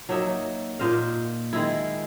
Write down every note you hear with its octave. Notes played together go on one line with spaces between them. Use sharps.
F#3 A#3 D#4 E5
A#2 C5 D#5 F5
D#3 G#3 E4